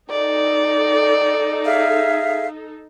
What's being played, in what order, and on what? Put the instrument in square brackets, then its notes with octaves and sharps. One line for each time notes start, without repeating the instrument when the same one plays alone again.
[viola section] D#4 A4 [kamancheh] D5
[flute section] G#4 E5 F5